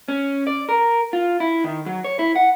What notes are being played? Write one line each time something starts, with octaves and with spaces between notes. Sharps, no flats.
C#4
D5
A#4
F4
E4
D#3
F#3
C#5
E4
F#5